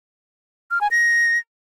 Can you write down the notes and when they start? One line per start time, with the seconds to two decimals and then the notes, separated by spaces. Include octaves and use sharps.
0.71 F6
0.81 G#5
0.91 A#6